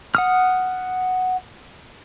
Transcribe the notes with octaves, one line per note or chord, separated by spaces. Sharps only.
F#5 D#6 F6